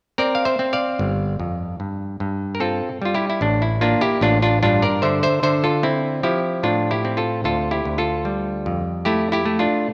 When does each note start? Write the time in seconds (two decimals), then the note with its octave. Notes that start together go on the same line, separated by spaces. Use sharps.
0.18 C4 A#4 D5
0.35 F5
0.45 C5 E5
0.59 C4
0.73 D5 F5
0.99 G1
1.40 F2
1.80 G2
2.20 G2
2.55 A#4
2.60 C4 F4 A4
3.02 G3 F4
3.14 E4 G4
3.30 E4
3.41 A1 D4
3.62 E4
3.81 A#3 D4 F4
4.01 E4 G4
4.21 A1 D4 F4
4.42 D4 F4
4.63 G2 D4 F4
4.82 A#4 D5
5.02 D3 C5 E5
5.23 C5 E5
5.43 D3 C5 E5
5.64 F4 A4
5.83 C4 E4
6.23 F3 E4 G4
6.63 A2 D4 F4
6.91 E4 G4
7.05 C4
7.17 F4 A4
7.44 D2 F4 A4
7.71 E4 G4
7.85 D2
7.98 F4 A4
8.25 G3
8.66 F2
9.05 A3 E4 G4
9.32 E4 G4
9.46 A3
9.59 D4 F4